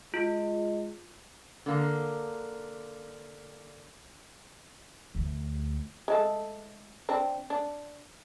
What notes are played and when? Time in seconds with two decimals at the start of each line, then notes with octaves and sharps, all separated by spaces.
0.14 G#3 F4
1.66 D3 A#3
5.15 D2 A3
6.08 G#3 A3 A4
7.09 C4 D4
7.50 D4